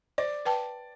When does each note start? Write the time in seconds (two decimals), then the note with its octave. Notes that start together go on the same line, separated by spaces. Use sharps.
0.18 C5 D5
0.45 B4 G5 A5